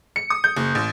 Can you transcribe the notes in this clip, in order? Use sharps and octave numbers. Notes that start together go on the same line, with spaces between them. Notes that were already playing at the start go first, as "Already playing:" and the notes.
C#7
D#6
G6
F#1
A1